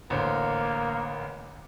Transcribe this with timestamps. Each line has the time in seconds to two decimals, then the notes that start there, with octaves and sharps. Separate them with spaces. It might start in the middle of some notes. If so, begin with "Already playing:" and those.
0.10 A1 D3 A#3 C5